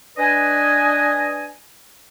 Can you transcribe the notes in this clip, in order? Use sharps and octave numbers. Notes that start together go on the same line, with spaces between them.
D4 B4 D#5 G#5